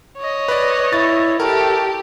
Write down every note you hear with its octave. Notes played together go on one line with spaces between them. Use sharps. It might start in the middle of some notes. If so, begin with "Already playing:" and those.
C#5 D#5
B4 D5
E4 A6
G4 A4 A#4